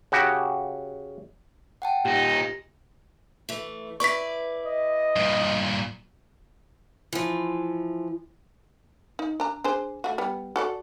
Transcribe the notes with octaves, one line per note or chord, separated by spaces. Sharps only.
C#3 F#4 G4
F#5 G5 A5
A#2 D#4 G4
A#6
E3 A3
E4 B4 D5 C#6 B6
D#5
G2 A#2
E3 F3
D#4
D4 A#5
D4 G#4 C5
A3 F#4
G3 B3
F#4 A4 D5